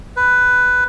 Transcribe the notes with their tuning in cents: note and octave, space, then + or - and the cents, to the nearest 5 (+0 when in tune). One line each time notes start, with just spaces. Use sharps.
B4 +10